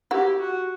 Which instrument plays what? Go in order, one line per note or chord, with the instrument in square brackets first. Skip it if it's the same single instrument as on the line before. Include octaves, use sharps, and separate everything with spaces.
[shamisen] E4 F#4 [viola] G4
[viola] F#4